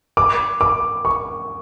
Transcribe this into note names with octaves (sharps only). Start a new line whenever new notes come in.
D6
D6
C#6